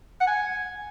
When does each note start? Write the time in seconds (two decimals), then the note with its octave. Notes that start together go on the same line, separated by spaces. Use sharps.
0.21 F#5
0.27 G#5